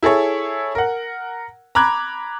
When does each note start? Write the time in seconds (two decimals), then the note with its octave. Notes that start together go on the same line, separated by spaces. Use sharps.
0.03 E4 G#4 A4 C#5
0.75 A#4 F#5
1.75 A#5 B5 D6 F#6 G#6